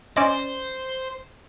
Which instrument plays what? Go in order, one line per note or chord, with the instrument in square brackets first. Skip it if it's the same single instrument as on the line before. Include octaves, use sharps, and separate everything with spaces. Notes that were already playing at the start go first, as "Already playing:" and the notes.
[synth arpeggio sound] C#4 D5 D#5 [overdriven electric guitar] C5